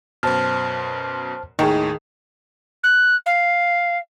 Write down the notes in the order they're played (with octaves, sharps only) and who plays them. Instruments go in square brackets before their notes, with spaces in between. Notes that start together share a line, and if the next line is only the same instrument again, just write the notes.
[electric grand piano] F#2 B2 [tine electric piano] C5 A5 F6
[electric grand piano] D#2 A2 C#6 [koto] D#3 [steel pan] D#4 G#4
[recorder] F#6
F5